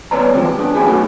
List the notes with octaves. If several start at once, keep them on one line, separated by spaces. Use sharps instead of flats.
B3 B4 C#5 D5 A#5
E3 F3 G3 C4
G4
B3 D4
C#4 E4 G4 G#4
F#3 A3 B3 D#4 F#4